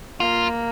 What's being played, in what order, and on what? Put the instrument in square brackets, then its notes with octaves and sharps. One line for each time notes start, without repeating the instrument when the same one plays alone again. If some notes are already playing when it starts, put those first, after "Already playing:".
[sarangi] A#3 [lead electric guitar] F4